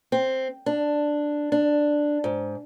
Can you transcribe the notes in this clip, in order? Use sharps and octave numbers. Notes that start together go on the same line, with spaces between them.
C4
D4
D4
G#2